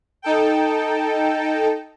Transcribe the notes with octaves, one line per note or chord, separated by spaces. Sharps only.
D#4 A4 G5